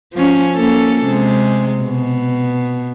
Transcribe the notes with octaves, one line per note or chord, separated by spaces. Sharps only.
F3 C#4
A#3 C#4 A4
C3 G#3
B2